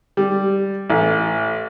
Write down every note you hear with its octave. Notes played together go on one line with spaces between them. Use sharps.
G3
A1